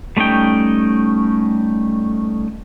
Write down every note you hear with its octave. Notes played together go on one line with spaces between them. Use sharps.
G3 A3 C#4 D#4 G5